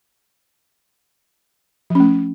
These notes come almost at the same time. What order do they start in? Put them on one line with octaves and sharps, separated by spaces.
F3 C#4 A3